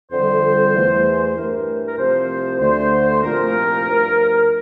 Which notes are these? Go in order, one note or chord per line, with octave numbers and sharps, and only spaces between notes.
F2 D3 G3 C5
E2 E3 A3
G2 E3 A3 A#4
A#4
C2 C3 F3 A3 C5
D2 D3 A3 C5
C2 A#2 F3 A3 A#4
G2 F3 A3